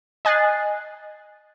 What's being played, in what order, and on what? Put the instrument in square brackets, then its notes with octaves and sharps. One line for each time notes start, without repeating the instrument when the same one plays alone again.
[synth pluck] D#5 G#5 F#6 A6 C7